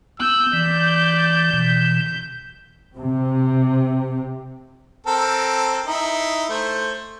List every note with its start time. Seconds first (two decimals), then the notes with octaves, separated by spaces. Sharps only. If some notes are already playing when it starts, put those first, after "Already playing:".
0.20 B3 E6 G6
0.53 E3 D5
1.54 B2 E3
2.96 C3
5.07 C4 A4 A#4
5.86 D#4 E4
6.49 A3 C5